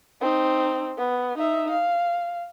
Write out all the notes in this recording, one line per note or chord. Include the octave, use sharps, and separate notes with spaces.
C4 D#4
B3
D#4 E5
F5